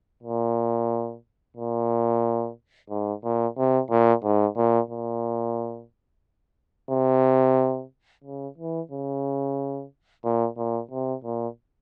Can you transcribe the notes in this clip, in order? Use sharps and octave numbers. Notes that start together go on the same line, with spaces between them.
A#2
A#2
G#2
A#2
C3
A#2
G#2
A#2
A#2
C3
C#3
E3
C#3
A#2
A#2
C3
A#2